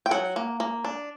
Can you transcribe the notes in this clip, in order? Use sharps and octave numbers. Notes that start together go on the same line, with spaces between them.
G5
F#3 F#5
A#3
A#3
D4